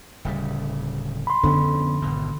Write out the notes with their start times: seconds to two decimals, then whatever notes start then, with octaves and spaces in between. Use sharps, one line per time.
0.25 D1 C#3 G3
1.27 B5 C6
1.43 F2 D3 B3 C#4
2.02 G#1 B2